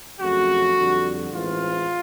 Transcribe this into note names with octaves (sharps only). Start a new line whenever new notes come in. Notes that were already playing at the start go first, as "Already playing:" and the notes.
F2 C#3 F#3 A3 F#4
F2 D3 G3
A1 G#2 E3 G#3 C4 F4